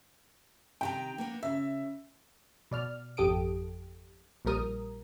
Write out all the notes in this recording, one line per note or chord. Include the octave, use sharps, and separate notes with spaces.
C3 D#3 G5 A#5
A#3 B3 D4
C#3 E5
B2 D5 F6
G#1 F2 G4 A4 D#6 D7
A#1 A#2 G3 A#4 D#6